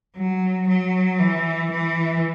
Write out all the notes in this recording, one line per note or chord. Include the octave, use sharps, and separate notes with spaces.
F#3
F#3
E3
E3